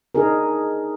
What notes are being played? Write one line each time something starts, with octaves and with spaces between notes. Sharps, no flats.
D4 D#4 G#4 A#4